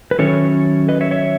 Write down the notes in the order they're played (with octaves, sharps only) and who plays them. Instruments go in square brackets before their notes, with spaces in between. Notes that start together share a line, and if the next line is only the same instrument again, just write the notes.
[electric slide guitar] B4
D#3 F#3 C#4 E4 A4 C#5
B4 D#5
C#5 E5
C#5 E5